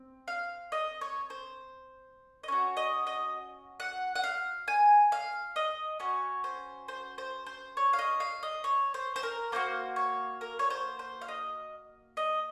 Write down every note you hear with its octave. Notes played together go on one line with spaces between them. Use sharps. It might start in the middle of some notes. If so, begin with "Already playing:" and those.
Already playing: C4
F5
D#5
C#5
C5
D#5
C#4 F#4 C#5
D#5
D#5
F#5
F#5
F5
G#5
F5
D#5
C#4 F#4 C#5
C5
C5
C5
C5
C#5
F5
D#5
F5
D#5
C#5
C5
C5
A#4
A#3 D#4 F#4 C5
C#5
A#4
C#5
C5
C5
F5
D#5
D#5